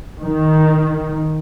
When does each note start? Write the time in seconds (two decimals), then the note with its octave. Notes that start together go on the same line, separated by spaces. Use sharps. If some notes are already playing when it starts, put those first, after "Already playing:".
0.24 D#3